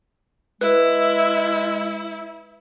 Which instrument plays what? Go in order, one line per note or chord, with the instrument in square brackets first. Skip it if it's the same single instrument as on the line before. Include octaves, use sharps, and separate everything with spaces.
[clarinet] G#3 [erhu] E4 [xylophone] B4